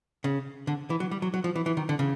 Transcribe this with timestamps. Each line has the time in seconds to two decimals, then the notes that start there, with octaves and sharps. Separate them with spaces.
0.24 C#3
0.67 D3
0.90 E3
1.00 F#3
1.11 G3
1.22 F#3
1.34 F#3
1.44 F3
1.56 E3
1.66 E3
1.77 D#3
1.89 D3
1.99 C#3